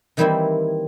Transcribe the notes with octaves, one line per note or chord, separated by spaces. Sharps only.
D#3 E3 G3 A#3 C4 E4